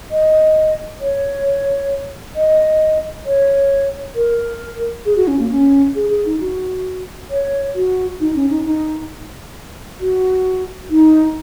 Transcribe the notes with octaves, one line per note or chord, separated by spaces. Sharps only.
D#5
C#5
D#5
C#5
A#4
G#4
F#4
C#4
A#3
C#4
G#4
G#4
D#4
F#4
C#5
F#4
D#4
C#4
D#4
D#4
F#4
D#4